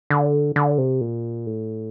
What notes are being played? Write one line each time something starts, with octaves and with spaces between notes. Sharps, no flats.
D3
D3
C3
A#2
A2